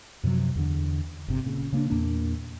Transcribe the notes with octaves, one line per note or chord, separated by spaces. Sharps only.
F#2 C3 F3 F#3
E2 D3
G1 C3
A#2 C#3
C#3 A#3 C4 D4
E2 A#2 A#3 D4